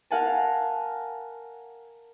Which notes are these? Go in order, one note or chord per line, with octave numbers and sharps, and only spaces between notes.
A#4 F5 F#5 G#5 A5